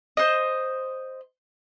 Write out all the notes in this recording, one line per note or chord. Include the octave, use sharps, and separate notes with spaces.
C5 D#5